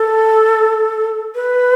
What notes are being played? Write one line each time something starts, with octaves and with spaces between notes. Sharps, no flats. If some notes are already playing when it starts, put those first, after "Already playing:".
Already playing: A4
B4